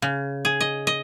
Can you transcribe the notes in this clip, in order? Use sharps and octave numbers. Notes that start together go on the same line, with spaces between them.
C#3
G#4
D#5
D#5